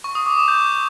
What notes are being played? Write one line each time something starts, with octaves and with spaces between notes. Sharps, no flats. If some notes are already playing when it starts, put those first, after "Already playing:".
C#6
D#6
D6
E7
G6